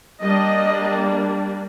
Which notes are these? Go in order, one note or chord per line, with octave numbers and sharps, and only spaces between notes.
G3 A#3 D4 D#5